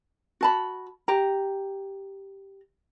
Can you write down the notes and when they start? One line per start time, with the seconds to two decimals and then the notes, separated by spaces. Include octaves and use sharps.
0.41 F#4 A5 B5
1.08 G4 A#5